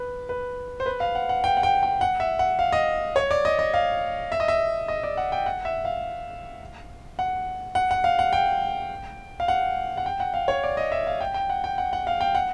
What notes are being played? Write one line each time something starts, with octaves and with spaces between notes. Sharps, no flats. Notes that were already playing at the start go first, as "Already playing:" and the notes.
Already playing: B4
B4
C5
B4
F5
F#5
F#5
G5
F#5
G5
G5
F#5
E5
F#5
F5
D#5
C#5
D5
D#5
D#5
F5
E5
D#5
E5
D#5
D5
F#5
G5
F#5
E5
F5
F#5
F#5
F#5
F5
F#5
G5
F5
F#5
F#5
G5
F#5
F5
C#5
D5
D#5
E5
F5
G5
G5
F#5
G5
F#5
F#5
F5
G5
F#5